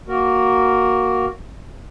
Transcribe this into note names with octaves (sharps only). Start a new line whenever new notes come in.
A#3 F#4 A#4